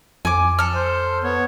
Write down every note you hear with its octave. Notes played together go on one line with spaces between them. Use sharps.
F2 G#5 D6
A4 F6
C5
B3 C#5